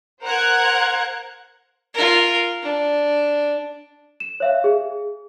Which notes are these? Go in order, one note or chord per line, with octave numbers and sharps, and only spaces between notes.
A#4 C5 F#5 A#5 F#6 G#6
F4 A#4
D4
E7
C#5 E5 F5
G#4